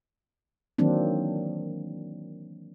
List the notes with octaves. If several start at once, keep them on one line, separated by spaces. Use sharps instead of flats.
D#3 E3 F#3 A#3 C4 D4